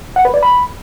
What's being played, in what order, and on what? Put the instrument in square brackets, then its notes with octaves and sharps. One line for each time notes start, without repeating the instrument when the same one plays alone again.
[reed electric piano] F#5
B4
D5
B5